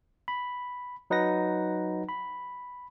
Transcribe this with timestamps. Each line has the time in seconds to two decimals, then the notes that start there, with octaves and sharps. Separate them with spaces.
0.28 B5
1.10 F#3 D#4 B4 F#5 A#6
2.09 B5